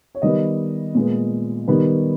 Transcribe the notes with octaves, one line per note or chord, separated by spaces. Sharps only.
C#5
D#3 G3 B3 D#5
A#2 G#3 B3
D#3 G3 B3 B4